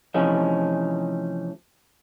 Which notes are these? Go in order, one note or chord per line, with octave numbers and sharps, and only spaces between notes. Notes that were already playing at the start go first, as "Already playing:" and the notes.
C3 E3 F3 A3 C#4 D#4